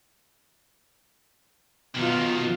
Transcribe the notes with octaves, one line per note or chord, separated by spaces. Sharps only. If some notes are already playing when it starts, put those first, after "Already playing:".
F#2 B2 D#3 F4